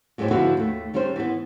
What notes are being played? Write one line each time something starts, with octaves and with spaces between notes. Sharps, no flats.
F#2 A2 G#3 C#4 G4 C5
D3 F3 E4 F#4 B4
D#2 A3
D#3 G3 C#4 D4 C5
E3 B3